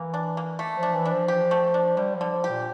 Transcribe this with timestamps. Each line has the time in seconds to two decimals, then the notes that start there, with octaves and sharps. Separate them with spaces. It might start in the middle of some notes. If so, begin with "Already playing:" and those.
Already playing: E3 A#3
0.14 D4
0.37 A#3
0.59 A3
0.77 F3
0.83 D4
0.94 E3
1.06 D4
1.12 F3
1.28 G4
1.51 A3
1.74 D4
1.97 D3 G3
2.15 F3
2.21 D3
2.32 F3
2.44 G4
2.49 A#2